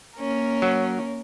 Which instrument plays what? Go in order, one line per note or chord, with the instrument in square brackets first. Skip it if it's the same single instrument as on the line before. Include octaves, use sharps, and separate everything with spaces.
[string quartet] A#3 C#4 A#4
[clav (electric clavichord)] F#3